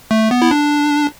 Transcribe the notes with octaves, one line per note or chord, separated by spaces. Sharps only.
A3
B3
E4
D4